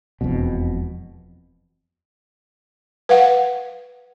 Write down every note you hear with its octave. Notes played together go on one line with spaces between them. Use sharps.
E1 F2 B2
B4 F5 F#5